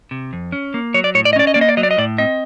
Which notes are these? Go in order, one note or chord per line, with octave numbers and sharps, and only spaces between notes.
C3
F2
C#4
A#3
F#3 C#5
D5
A2 C#5
D5
D#5
C#4 D5
D#5
A#3 D5
D#5
D5
F#3 D#5
D5
D#5
A2 D5
C4 D#5